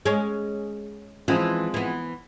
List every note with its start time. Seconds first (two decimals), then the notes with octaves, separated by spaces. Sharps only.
0.05 G#3 C#4
1.28 E3 F3 G#3 C4
1.74 E3 B3